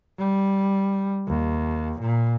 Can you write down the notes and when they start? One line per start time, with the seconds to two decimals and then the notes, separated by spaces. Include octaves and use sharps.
0.19 G3
1.28 D#2
2.01 A#2